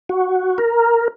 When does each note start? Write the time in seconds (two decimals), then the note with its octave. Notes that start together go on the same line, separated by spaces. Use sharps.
0.09 F#4
0.58 A#4